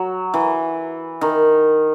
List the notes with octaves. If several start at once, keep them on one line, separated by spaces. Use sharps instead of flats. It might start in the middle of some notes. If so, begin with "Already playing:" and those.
Already playing: F#3
E3
D#3